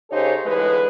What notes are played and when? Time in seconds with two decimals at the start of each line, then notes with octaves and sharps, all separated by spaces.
0.11 C#3 D#4 G4 A4 C5 C#5
0.46 D3 E3 G#3 B4